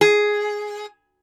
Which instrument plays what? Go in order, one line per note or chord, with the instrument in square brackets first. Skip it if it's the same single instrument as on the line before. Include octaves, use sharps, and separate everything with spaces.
[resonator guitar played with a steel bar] G#4